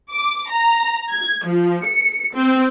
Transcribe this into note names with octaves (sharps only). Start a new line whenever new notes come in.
D6
A#5
G#6
F3
C#7
C4